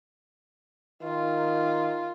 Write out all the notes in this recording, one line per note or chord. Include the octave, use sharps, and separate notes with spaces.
D#3 F4